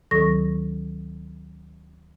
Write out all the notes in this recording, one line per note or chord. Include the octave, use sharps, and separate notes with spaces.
D2 D#3 F#3 A4 C#6 A#6